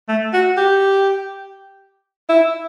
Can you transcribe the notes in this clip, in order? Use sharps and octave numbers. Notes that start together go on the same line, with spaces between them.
A3
F#4
G4
E4